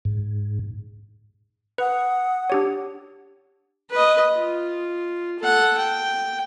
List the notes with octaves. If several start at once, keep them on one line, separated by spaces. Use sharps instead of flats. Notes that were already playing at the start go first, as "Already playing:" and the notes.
G#2
B4 F#5 D#6
D4 G4 C#5
B4 D#5
F4
A4 F#5
G5